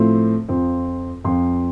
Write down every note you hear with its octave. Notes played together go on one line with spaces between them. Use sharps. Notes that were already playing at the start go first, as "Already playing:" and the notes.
Already playing: A2 F3 A3 C4
F2 F3 C4
F2 F3 C4 C6